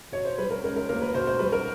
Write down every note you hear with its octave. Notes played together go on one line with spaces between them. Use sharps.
B2 C#5
C5
G3 B4
A#4
C#2 A#4
A#4
A#3 A#4
B4
B2 C5
C5
G3 B4
A#4